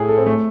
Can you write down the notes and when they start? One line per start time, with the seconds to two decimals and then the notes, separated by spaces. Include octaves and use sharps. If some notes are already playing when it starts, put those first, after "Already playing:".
Already playing: A2 G#4
0.09 A4
0.18 C4
0.26 A3